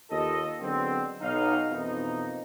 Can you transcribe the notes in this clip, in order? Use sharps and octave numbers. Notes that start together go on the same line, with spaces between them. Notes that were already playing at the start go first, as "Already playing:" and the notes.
D#2 F4 A4 D#5
D3 F#3 G#3 B3 C4
B1 D#4 F5
F2 B2 E3 A#3 D#4